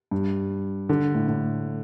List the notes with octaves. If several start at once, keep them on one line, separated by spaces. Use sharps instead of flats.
G2
D3
A2
A2